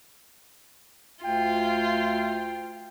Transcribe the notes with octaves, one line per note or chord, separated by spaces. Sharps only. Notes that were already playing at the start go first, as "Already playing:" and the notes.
D2 F4 G5